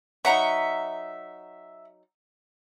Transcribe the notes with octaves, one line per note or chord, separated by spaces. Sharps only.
F#3 D#4 E5 F#5 A#5